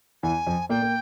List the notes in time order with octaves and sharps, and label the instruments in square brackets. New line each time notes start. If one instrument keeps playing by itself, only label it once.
[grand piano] E2 E3 [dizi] G#5
[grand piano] F2 F3
[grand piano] A#2 A#3 [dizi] G5
[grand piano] A#3